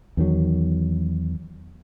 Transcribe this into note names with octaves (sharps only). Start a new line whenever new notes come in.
E2 D#3 F#3